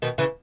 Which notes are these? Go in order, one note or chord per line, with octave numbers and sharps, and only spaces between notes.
B2 D#3
C#3 E3